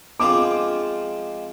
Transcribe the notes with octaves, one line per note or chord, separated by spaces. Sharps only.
F3 G#3 C4 F4 D6